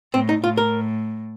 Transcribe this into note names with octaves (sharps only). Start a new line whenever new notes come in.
A2 C4
D#4
A2 F4
A#4